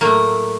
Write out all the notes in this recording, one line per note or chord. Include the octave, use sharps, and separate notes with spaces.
A2 F#3 A3 A#3